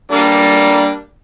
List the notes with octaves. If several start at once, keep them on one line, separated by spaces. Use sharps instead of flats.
G3 A#3 D4